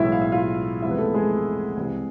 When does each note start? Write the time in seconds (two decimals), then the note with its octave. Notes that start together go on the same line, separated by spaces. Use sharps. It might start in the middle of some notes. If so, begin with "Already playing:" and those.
Already playing: B1 A2 E3 G#3 E4 E5
0.12 F5
0.22 E5
0.32 F4 F5
0.82 E2 C3 F3 G#3 E4 E5
0.91 B4
0.98 A3 A4
1.14 G#3 G#4
1.77 C2 C3 E3 G#3